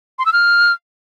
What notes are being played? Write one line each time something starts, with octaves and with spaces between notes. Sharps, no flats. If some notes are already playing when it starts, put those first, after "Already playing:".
C6
E6
F6